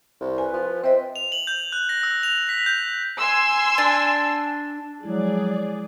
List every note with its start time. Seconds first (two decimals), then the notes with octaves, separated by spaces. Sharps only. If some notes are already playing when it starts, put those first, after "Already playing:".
0.21 C2
0.38 B4 G#5
0.53 F3
0.84 C4 C5 D#5 E5
1.16 F7
1.32 F#7
1.47 G6
1.72 F#6
1.89 A#6
2.03 E6
2.23 F7
2.49 B6
2.66 G6
3.19 G#5 C6 E6
3.78 D4
5.03 F3 F#3 G#3 E4 G#4 D5